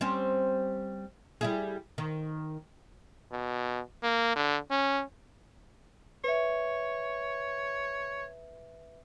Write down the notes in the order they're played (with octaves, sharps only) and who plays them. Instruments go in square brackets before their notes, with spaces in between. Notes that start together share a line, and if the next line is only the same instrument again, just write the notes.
[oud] G3 C4 C#4
G3 E4 G#4
D#3
[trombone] B2
A#3
D3
C#4
[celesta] B4 E5 [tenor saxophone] C#5